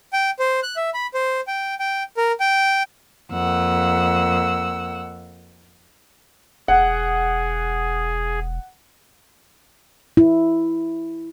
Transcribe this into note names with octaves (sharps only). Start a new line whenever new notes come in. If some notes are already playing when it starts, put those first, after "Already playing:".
G5
C5
F#6
E5
B5
C5
G5
G5
A#4
G5
F2 A#3 F#5 E6
E1 G#4 F#5
E4